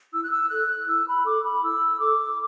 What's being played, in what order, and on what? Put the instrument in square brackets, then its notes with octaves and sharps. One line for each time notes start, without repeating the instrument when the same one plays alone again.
[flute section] E4 E6
F#6
E6
A4 F#6
E4 E6
B5
A4 D6
B5
E4 E6
A4 D6